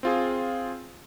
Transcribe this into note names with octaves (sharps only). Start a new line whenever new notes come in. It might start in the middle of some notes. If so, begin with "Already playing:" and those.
C4 F4 G#4